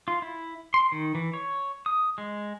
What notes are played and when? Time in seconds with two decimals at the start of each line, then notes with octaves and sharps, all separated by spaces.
0.08 F4
0.22 E4
0.74 C6
0.92 D#3
1.15 E3
1.33 C#5
1.86 D#6
2.18 G#3